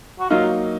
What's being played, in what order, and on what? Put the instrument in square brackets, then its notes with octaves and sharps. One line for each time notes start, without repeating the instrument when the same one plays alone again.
[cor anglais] F#4
[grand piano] F#3 A#3 D#4 [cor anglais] F4